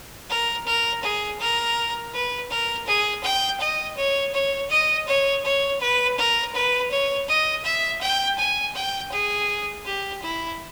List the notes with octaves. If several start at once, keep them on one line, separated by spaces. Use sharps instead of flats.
A#4
A#4
G#4
A#4
B4
A#4
G#4
G5
D#5
C#5
C#5
D#5
C#5
C#5
B4
A#4
B4
C#5
D#5
E5
G5
G#5
G5
G#4
G4
E4